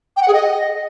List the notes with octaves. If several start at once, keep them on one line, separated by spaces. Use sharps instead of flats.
G5
F#5
G#4
D#5